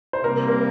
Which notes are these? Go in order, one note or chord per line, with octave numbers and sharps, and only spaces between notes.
C5
C3 G3 A#3 A#4
A#4